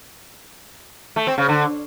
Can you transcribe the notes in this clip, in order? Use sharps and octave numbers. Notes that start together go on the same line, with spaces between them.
A3
C4
C#3
D3